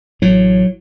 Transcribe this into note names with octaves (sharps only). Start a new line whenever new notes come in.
A1 A2 F#3